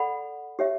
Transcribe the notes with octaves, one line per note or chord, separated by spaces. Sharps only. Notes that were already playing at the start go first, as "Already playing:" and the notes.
Already playing: A4 D5 F#5 B5
G4 C#5 E5